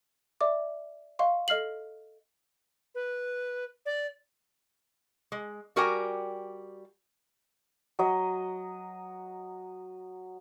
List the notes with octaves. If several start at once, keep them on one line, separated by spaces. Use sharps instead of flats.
D5 E5 D6
D#5 F5 C6 C#6
A4 D#5 F6 C7 F#7
B4
D5
G#3
G3 F#4 A#4 D5 G5 G#5
F#3 D#5